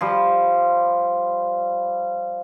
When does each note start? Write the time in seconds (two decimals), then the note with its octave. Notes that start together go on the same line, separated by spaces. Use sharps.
0.01 F3 G3